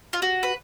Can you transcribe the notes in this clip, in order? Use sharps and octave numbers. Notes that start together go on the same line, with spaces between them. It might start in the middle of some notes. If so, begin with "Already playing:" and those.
F4
F#4
B4